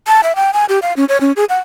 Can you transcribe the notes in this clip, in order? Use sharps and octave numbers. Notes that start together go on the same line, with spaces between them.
A5
E5
G5
G#5
G4
F5
C#4
C#5
C#4
G#4
F#5